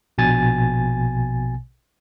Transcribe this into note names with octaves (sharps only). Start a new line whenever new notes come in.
A#1 B2 G#5 A6